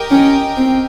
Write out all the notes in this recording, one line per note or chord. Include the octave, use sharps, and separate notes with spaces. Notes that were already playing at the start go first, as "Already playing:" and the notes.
Already playing: G4 A#4 D#5 G5
C#4
C4